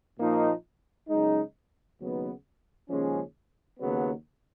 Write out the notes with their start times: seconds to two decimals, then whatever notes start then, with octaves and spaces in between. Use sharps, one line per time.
0.19 A#2 F3 A#3 D#4
1.09 F#2 C#3 G#3 D#4
1.99 D#2 C#3 F#3 B3 D#4
2.89 D#2 C#3 F3 G#3 C#4
3.79 D#2 C#3 F#3 B3